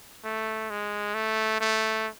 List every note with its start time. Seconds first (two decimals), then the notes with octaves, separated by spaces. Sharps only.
0.25 A3
0.70 G#3
1.15 A3
1.61 A3